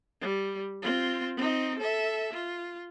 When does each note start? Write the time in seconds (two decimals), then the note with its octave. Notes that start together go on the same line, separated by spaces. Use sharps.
0.21 G3
0.82 C4 F4
1.37 C4 D#4
1.79 A4 E5
2.32 F4